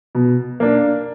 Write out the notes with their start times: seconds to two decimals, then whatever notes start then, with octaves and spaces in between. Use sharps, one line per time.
0.15 B2
0.60 A#3 D4